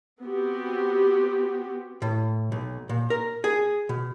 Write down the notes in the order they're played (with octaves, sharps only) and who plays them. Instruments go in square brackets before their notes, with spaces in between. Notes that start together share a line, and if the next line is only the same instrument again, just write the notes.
[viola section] B3 C4 F#4 G4
[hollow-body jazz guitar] A2
B1
A#2
A#4
G#4
B2